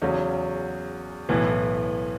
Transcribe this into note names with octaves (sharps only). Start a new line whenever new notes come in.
E2 C#3 F#3 C#4
B1 A2 E3 B3